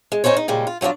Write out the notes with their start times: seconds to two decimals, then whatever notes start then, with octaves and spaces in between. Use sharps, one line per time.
0.12 G#3
0.24 C#4 D#4 A4 C5 C#5
0.37 D#4
0.48 A#2 C#3 G3 G#3
0.67 F4
0.81 F3 F#3 A#3 D4 F4